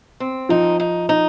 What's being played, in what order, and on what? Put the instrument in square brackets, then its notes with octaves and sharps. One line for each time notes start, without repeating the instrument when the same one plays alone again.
[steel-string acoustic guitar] C4
[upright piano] F3 [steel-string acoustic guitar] D#4
[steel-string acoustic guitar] D#4
D#4